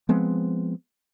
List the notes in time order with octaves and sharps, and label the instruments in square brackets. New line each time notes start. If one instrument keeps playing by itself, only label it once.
[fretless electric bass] F3 G#3 B3 C4